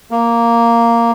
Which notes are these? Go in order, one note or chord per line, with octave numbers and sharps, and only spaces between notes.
A#3